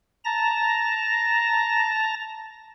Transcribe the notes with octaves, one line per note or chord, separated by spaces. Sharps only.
A5 A#5 A#6